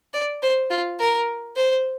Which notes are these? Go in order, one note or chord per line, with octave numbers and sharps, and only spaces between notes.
D5
C5
F4
A#4
C5